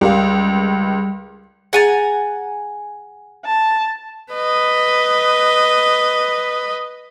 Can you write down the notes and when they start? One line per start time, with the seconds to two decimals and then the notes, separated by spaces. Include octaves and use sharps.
0.01 C#2 G3 G4 A#4 F5
1.73 G#4 F#5 G#5 A#5 A6
3.45 A5
4.33 B4 D#5